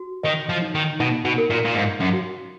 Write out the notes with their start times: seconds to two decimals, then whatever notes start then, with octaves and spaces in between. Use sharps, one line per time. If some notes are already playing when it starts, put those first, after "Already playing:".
Already playing: F#4
0.23 D#3 D#5
0.49 F3
0.62 D#4
0.75 D#3
1.00 B2 D#4
1.24 B2
1.38 A#4
1.50 A#2
1.65 A#2
1.75 G#2 F5
2.01 F#2
2.13 F#4